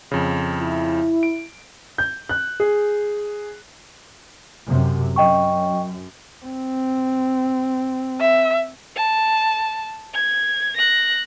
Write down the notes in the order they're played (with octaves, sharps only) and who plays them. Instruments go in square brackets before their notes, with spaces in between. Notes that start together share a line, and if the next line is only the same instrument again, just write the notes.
[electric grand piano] F2 C#3
[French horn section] E4
[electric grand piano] D7
[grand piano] G6
F#6
G#4
[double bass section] F#2 C3
[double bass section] F#2 [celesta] D#5 G5 C#6
[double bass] C4
[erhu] E5
[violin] A5
G#6
F#6 A#6